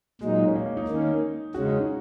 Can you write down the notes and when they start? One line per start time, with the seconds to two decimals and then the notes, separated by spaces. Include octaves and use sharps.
0.21 A#2 F#3 G#3 D#4
0.48 C#4
0.55 A#3
0.66 A#3
0.77 D#4
0.88 D#3 A#3 C#4
1.54 C#3 G#3 C#4 F#4
1.66 D#4
1.77 D#4